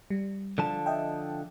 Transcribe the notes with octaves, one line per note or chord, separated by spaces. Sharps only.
G3
D3 F3 A5
D#5 E5 G5